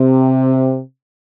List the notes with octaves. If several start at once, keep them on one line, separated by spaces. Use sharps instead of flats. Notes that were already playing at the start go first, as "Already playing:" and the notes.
Already playing: C3